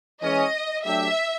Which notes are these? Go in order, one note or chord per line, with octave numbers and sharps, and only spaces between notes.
E3 G#3 C#4 D#5
F#3 A3 D4 G4 E5